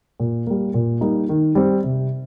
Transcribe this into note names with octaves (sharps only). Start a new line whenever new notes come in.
A#2
G3 A#3
A#2
G3 A#3 D#4
D#3
G3 C4
C3